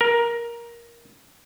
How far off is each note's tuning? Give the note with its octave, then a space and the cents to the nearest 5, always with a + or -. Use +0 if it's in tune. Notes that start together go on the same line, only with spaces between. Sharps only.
A#4 +10